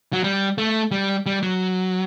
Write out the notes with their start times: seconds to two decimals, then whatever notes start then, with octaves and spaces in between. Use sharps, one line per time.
0.13 F#3
0.24 G3
0.58 A3
0.91 G3
1.26 G3
1.43 F#3